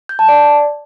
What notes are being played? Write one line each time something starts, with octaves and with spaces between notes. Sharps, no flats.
G6
A5
D5